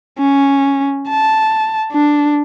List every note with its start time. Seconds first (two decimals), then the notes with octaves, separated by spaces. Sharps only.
0.19 C#4
1.09 A5
1.92 D4